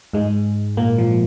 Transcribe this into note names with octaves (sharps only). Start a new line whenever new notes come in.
G#2 G#3
A#2 A#3
F3